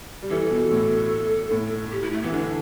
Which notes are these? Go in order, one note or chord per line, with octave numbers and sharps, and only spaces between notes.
G3
E3 A4
B2
A2
A2
G4
E4
A3
E3 B3
D3 D4